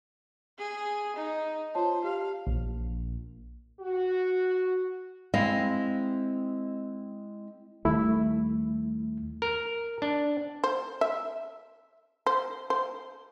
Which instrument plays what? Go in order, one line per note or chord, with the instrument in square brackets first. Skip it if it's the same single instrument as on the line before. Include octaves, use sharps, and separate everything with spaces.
[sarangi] G#4
D#4
[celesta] F4 C#5 A5 [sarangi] C5
[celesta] G4 [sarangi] F5
[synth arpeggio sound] A#1
[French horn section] F#4
[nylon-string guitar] G#3 C4 E4 D#5 F5
[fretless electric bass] D#2 D#3 G3 [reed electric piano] A3 E4
[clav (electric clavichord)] A#4
D4
[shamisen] C5
E5
C5
C5